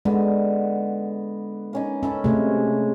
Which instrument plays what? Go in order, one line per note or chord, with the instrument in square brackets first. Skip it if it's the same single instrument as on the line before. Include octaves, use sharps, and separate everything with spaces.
[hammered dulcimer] D3 B3 F#4 [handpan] G#3
[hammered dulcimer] A#3 C#4 D#4
[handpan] C#4 [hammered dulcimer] A4 E5 B5
[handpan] C3 A3 [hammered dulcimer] G#3